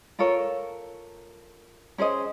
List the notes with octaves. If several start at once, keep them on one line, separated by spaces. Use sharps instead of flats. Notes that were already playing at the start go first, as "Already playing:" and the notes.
F4 A4 A#4 C#5
C#4 G#4 C5 D#5